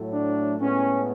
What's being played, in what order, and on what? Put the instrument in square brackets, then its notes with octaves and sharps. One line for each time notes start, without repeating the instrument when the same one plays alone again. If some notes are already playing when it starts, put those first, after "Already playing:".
Already playing: [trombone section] A2 F#3 A3
D4
A2 G#3 B3 C#4